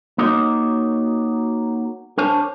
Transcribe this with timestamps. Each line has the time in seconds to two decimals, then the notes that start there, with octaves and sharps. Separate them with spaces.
0.18 A#3 D#4 F#4 A#4 C#5 D#5
2.18 D4 A#4 C5 C#5 G#5 A5